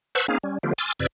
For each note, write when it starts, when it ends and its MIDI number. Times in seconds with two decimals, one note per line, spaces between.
0.15 0.27 71
0.15 0.27 72
0.15 0.27 78
0.15 0.27 81
0.15 0.27 85
0.15 0.27 88
0.28 0.38 58
0.28 0.38 60
0.28 0.38 61
0.28 0.38 63
0.28 0.38 68
0.28 0.38 77
0.43 0.58 55
0.43 0.58 61
0.63 0.73 50
0.63 0.73 53
0.63 0.73 57
0.63 0.73 59
0.63 0.73 65
0.63 0.73 67
0.78 0.93 80
0.78 0.93 84
0.78 0.93 86
0.78 0.93 88
0.78 0.93 89
0.78 0.93 93
0.99 1.07 41
0.99 1.07 48
0.99 1.07 71
0.99 1.07 74
0.99 1.07 88
0.99 1.07 92